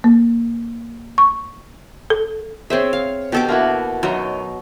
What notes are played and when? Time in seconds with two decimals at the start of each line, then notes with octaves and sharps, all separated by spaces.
0.04 A#3
1.18 C#6
2.10 A4
2.70 C4 G#4 C5 C#5 E5
2.93 F5
3.32 B2 G4 A4 D6
3.49 A#3 E4 F#4
4.03 F#2 F#3 D#4